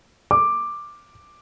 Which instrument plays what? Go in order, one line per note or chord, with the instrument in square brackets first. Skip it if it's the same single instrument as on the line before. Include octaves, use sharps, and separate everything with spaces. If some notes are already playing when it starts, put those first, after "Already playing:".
[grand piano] D6